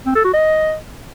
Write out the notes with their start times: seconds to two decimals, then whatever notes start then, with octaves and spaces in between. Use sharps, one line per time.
0.06 C4
0.15 A4
0.24 F#4
0.34 D#5